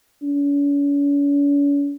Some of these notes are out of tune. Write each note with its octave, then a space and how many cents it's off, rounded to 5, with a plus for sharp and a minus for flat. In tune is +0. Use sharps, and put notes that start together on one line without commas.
C#4 +45